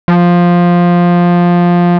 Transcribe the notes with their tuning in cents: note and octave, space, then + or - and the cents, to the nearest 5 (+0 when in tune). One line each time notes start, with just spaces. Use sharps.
F3 +5